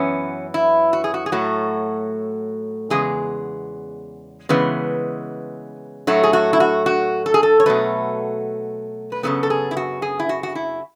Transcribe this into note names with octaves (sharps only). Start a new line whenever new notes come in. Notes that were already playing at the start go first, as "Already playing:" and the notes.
Already playing: F#2 E3 B3 C#4
E4
F#4
G#4
F#4
G#4
A2 F#3 A3 F#4
E2 C#3 G#3 B3 G#4
C#3 E3 G#3 B3
A2 F#3 A3 F#4
G#4
F#4
E4
F#4
F#4
A4
G#4
A4
C#5
B2 F#3 A3 B4
B4
F#2 C#3 E3 B3 A4
A4
G#4
E4
F#4
G#4
E4
F#4
F#4
E4